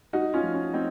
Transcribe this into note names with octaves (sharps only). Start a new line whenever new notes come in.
C2 D#4 F#4
C#4 F4
F3
C#4
C4 D#4